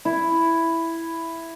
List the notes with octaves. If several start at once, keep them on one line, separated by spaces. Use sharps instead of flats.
E4